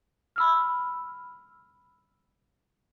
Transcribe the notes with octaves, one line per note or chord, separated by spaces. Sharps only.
B5 E6 F6